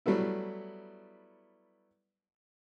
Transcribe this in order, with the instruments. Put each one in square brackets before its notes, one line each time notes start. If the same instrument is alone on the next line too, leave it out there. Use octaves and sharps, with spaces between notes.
[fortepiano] F#3 G3 A3 B3 E4